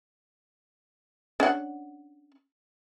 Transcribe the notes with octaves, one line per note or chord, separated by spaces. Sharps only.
C#4 D4 F#5